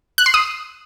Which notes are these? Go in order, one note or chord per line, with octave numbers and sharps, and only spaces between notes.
F#6
C6
D#6